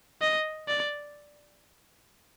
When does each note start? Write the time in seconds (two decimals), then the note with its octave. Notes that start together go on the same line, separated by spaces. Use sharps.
0.22 D#5
0.68 D5